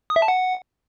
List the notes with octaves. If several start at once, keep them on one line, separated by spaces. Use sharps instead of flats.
D#6
E5
A5
F#5